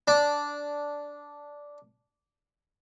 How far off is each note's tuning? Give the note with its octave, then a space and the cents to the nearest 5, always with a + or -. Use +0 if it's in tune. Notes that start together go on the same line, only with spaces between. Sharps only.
D4 -10